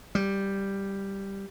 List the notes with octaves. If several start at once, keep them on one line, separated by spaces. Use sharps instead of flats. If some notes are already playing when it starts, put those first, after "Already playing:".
G3